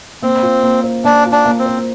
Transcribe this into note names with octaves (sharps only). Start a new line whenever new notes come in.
A#3 C4
F4
A#3
C5
A#3 D4
F4
D4
A#3
C4
C5